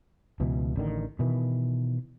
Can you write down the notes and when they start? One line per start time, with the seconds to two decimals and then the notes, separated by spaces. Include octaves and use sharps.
0.40 C#2 B2 E3
0.76 A1 D3 D#3
1.19 B2 D#3 E3